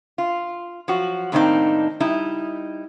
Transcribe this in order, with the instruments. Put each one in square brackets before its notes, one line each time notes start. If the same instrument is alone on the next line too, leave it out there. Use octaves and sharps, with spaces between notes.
[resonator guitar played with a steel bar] F4
F3 F#3 F#4
A2 D#3 A#3 C4 D4 D#4
G3 D#4 E4